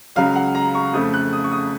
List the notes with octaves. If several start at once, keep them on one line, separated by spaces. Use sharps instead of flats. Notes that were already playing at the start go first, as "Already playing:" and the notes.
C#2 C#3 F#3 F5
F#5
A#5
C#6
F2 C#3 A3 D#6
F#6
D#6
C#6
D#6